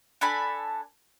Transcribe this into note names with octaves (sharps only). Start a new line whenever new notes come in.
D4 A4 G#5 B5